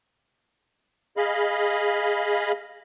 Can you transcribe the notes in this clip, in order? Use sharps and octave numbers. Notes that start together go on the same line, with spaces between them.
G#4 D#5 F5 B5